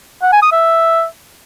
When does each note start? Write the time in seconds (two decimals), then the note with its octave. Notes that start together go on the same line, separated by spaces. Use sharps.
0.22 F#5
0.32 G#5
0.42 D#6
0.52 E5